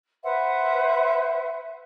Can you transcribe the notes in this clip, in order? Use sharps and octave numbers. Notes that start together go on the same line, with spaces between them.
B4 C5 E5 F#5